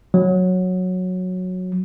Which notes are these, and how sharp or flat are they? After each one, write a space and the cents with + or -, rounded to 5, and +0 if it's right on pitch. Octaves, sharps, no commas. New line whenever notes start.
F#3 -10